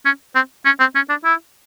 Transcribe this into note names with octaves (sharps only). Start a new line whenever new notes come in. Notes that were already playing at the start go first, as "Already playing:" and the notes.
C#4
C4
C#4
C4
C#4
D4
E4